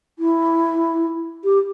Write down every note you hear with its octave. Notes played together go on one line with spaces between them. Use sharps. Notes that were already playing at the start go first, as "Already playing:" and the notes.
E4
G4